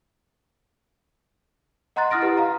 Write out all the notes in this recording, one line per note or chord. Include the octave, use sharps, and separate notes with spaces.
D#5 F#5 A#5 C6 F#6 A6
E4 F#5 D#6 F6 A#6 D7
E4 G4 B4 F#5
F5 A#5